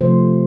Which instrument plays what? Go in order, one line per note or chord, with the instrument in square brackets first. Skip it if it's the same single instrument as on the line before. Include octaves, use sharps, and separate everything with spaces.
[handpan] C3 F3 A3 C5